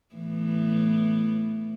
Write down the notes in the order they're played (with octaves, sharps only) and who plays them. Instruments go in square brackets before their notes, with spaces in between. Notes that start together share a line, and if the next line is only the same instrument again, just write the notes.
[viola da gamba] A2 E3 B3